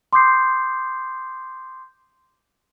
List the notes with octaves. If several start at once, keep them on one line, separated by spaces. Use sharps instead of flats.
C6 D6 D#6 G6 C7